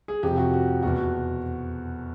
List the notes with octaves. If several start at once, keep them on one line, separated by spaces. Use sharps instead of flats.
G#4
F2 C3 F3 G4
F#4
F#4
E2 B2 F#4